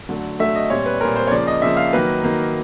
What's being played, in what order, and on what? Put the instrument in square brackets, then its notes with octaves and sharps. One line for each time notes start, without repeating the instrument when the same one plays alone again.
[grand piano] D3 F#3 A3
D3 F#3 A3 E5
D#5
A#2 G3 C4 C#5
B4
A#2 G3 C4 A#4
C5
C#5
C#3 F3 A#3 D5
D#5
C#3 F3 A#3 E5
F5
D#3 F#3 A#3 B4
D#3 F#3 A#3